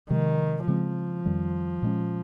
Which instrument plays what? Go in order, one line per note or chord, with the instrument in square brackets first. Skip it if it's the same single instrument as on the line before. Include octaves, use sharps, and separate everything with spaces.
[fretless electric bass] C3 F3 G#3 [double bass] D#3
[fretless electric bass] C#3 G#3 C4 [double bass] F3
[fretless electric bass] F2 D#3 G3
A#2 G#3 C#4